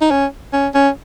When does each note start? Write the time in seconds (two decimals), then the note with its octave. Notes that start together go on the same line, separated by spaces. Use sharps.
0.01 D#4
0.11 C#4
0.53 C#4
0.74 C#4